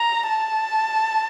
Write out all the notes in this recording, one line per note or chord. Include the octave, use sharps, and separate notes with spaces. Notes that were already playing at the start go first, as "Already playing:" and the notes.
Already playing: A#5
A5